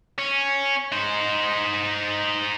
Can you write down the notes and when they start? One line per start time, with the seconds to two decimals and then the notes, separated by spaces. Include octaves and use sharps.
0.18 C#4
0.92 D#4 C5